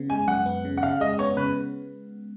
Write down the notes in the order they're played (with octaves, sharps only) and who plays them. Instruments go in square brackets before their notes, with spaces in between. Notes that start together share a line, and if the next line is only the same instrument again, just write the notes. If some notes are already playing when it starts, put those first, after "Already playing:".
Already playing: [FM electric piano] C#3 B3
[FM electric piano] G#3 [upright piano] G#5
[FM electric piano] F#2 [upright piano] F#5
[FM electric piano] B3
C#3
[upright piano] F#5
[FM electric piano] C#3 [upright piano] F5
[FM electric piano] G#3 [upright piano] D#5
[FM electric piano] B3 [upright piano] C#5
[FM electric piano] C#3 [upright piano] B4